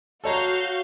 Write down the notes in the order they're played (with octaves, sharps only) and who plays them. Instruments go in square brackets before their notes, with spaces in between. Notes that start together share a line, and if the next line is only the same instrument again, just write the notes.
[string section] F#4 F5 G6 [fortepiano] A4 C#5 A#5